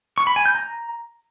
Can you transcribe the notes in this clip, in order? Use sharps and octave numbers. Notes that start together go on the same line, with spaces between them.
C#6
B5
G#5
G6
A#5